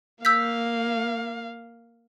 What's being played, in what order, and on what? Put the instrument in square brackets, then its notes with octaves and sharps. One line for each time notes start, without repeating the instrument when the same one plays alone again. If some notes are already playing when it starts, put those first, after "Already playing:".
[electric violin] A#3 F5 [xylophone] E6 G6 B6